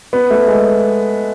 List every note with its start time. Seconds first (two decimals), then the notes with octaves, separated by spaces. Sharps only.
0.13 B3
0.30 A3
0.48 G#3